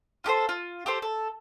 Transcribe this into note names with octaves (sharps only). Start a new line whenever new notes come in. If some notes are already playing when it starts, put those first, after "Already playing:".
F4 G4 A4 C5
F4
G4 A4 C5
A4